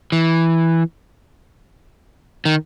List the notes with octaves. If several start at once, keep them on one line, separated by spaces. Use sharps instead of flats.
E3
D#3